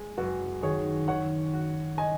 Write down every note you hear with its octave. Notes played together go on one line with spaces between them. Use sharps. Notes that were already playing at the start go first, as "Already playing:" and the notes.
Already playing: G#3 G#4
F#1 F#4 B4
D#3 G#4 C#5
D#3 C#5 F#5
F#4
D#5 G#5